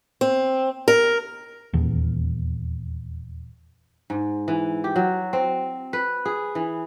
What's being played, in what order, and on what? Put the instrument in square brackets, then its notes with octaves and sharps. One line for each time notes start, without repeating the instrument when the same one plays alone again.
[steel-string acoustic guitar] C4
A#4
[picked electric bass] D#1 E2
[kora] G#2
E3
G4
F#3
C4
B4
G#4
E3